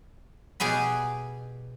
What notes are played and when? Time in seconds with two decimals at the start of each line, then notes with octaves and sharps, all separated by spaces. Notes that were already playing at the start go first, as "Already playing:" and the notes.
0.60 B2 G4 G#4 G#5 B5